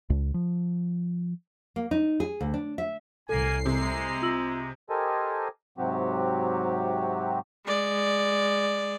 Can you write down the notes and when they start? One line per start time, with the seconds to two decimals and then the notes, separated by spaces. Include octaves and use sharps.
0.10 C#2
0.34 F3
1.76 A#3
1.91 D#4
2.20 G#4
2.41 D2
2.54 D4
2.78 E5
3.29 C2 A2 A#3 A4 G#5 C7
3.66 C3 G#3 A#5
4.22 F4 E6 F#7
4.90 G4 A4 A#4 C5 D#5 G#5
5.78 G#2 C3 F#3 C4 F#4 G4
7.66 G#3 D5